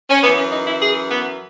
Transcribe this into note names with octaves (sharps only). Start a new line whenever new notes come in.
C#4
F#2 E3 B3
C#4
D#4
E4
G#4
B3